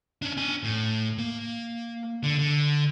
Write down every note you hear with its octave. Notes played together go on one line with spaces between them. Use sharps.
C#4 D4
D4 G#5
A2
A#3
D3
D3